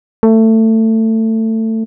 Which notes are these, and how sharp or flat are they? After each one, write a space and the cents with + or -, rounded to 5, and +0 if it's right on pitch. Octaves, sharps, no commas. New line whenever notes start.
A3 +20